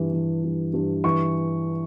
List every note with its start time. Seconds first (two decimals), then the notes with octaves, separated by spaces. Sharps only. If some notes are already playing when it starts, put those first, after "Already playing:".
Already playing: G2 E3
0.13 E3
0.44 G2
0.74 G2
1.04 E3 C#6